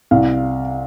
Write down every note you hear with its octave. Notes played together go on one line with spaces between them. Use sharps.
C2 F5